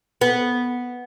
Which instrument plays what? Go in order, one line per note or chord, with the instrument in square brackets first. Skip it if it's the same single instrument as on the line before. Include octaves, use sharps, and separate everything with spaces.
[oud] B3